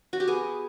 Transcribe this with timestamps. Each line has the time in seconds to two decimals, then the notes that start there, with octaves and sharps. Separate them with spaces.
0.13 F#4
0.20 G4
0.28 B3 G#4